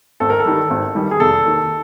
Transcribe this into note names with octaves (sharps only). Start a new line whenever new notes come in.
G#1 A4
A#4
A4
G2 D#3 G3
G#1
G2 D#3 G3
G#4
F1 A4
D#2 D#3